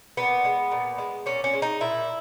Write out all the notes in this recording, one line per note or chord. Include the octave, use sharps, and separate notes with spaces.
A#2 B3
G#3
A#2
G#3
A#2 C#4
C#4
G#3
D#4
A#2 E4